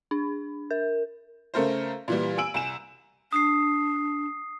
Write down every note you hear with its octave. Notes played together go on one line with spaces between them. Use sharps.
D4
A#4
C#3 A3 A#4 C5
A#2 E3 G3
G#5 E6 D7 F#7
C2 G#5 E7
D4 D#6 C7